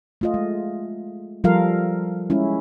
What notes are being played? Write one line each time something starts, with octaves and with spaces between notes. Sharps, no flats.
A3 F4 D#5
G#3
F3 G3 F4 A4 A#4 F5
G#3 C#4 E4